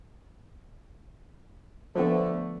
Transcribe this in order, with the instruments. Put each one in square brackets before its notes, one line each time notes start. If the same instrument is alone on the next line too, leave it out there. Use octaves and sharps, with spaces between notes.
[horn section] D3 A3 [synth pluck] F3 B3